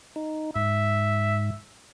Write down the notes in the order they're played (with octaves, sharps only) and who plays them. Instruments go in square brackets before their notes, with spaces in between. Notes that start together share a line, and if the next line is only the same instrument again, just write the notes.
[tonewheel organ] D#4
[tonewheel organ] G#2 [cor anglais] E5